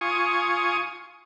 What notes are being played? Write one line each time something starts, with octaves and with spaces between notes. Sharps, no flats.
F4 G#5 C#6 D#6